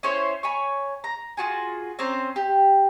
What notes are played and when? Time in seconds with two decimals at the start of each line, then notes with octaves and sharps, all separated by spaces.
0.03 C#4 E4 C5 C#5
0.43 C#5 G#5 B5 C#6
1.04 A#5
1.37 F4 F#4 G#4
1.99 C4 C#4 C5 A#5
2.36 G4